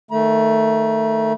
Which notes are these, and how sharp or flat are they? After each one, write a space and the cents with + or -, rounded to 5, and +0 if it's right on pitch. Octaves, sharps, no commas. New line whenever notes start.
D#3 +0 A3 +15 A#5 +45